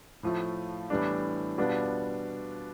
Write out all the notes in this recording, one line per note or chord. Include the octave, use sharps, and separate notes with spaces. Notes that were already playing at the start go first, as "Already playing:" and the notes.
A2 F3 A3
A2 E3 G3 B3 D4
B2 G3 B3 D4 F4